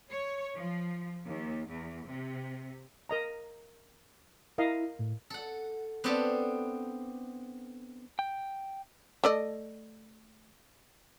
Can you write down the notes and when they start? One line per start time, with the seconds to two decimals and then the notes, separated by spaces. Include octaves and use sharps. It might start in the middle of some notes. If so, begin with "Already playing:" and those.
0.10 C#5
0.56 F3
1.27 D#2
1.67 E2
2.07 C3
3.09 A#4 D#5 A#5
4.58 E4 A#4 D#5 F5
4.99 A2
5.30 A4 F#5
6.04 B3 C4 D4 G4 A4 A5
8.19 G5
9.24 A3 D5 D#5